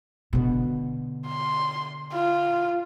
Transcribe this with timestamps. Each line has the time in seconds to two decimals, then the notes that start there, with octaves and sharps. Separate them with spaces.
0.33 B2 D3
1.28 C6
2.14 F4